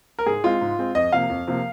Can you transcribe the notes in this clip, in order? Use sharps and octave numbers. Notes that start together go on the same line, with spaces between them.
A#4
G#2 G#4
G#3 C4 F4
G#2
G#3 C4
F2 D#5
C3 F3 A#3 F5
F2
C3 F3 A#3